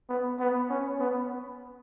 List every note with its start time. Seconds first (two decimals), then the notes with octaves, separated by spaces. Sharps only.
0.09 B3
0.40 B3
0.69 C#4
1.00 B3